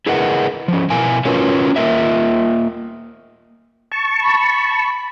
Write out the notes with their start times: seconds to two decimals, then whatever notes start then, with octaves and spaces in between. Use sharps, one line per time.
0.06 E4 G#4 A#4 B4 D#5 F#5
0.68 F3 C#4
0.90 B2 E4 A#4 F5 G#5
1.25 C#4 F4 F#4 A#4 B4 C#5
1.76 A#3 F4 A#4 D#5 E5
3.92 A5 C#6
4.20 B5